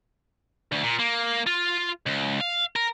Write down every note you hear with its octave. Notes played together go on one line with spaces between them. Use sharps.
D2
A#2
A#3
F4
C#2
F5
A#4